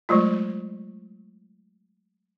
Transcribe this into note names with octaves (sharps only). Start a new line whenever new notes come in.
F#3 G#3 A3 F4